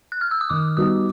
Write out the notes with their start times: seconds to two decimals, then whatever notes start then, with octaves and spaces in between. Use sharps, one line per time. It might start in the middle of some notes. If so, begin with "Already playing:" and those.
0.12 F#6
0.21 F6
0.31 E6
0.41 D#6
0.50 D#3 D6
0.77 G3 B3 D#4 F#4 D#6